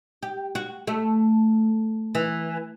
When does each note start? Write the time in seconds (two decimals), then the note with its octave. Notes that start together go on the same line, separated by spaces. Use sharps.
0.23 G4
0.55 F#4
0.87 A3
2.15 E3